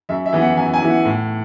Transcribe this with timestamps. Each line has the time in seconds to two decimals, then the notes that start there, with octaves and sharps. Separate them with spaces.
0.09 F#2 E5
0.26 E5
0.33 E3 B3 E4
0.41 F#5
0.57 F#2 G#5
0.73 G#5
0.82 E3 B3 E4
0.90 F#5
1.05 A2